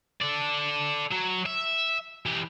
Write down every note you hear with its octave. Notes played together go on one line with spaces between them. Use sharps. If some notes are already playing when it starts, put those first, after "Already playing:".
A4 D5
F#3
E5
E3 G4